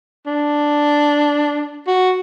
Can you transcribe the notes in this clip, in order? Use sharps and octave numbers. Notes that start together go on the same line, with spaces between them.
D4
F#4